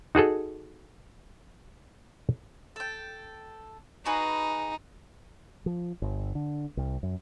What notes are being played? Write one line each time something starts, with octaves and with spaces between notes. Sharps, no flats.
D#4 F#4 G#4 A4
A4 G5
D#4 F#4 G#4 B4
F3
G1
D3
C2
F#2